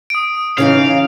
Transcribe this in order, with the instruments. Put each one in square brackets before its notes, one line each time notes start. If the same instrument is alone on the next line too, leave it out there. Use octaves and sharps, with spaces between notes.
[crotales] D#6 D7
[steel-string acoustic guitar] C#3 E3 D#4 [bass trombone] C#4 [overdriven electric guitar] F5